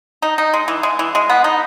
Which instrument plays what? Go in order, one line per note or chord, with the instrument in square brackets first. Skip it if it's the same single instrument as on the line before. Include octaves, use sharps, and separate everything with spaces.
[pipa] D#4
D#4
G#3
E3
G#3
E3
G#3
B3
D#4